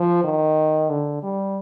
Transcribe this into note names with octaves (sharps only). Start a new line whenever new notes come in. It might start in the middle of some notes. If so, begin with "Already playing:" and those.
Already playing: F3
D#3
D3
G3